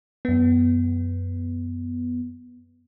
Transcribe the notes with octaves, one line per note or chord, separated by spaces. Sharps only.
F#2 B3